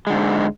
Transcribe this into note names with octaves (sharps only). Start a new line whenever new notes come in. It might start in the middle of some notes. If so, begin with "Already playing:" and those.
G#2 D3 G#3